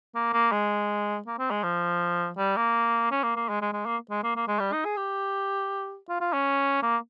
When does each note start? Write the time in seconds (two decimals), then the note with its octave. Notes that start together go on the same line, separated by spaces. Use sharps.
0.15 A#3
0.33 A#3
0.52 G#3
1.26 A#3
1.38 C4
1.51 G#3
1.63 F3
2.37 G3
2.57 A#3
3.11 C#4
3.23 A#3
3.36 A#3
3.49 G#3
3.62 G#3
3.73 G#3
3.86 A#3
4.10 G#3
4.24 A#3
4.36 A#3
4.48 G#3
4.60 G3
4.73 D#4
4.85 G#4
4.97 G4
6.09 F4
6.20 F4
6.33 C#4
6.83 A#3